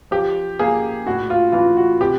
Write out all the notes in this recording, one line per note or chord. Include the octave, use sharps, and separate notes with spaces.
F3 G4
A#3 G#4
A2 F#4
F4
E3 F4
F#4
C3 G4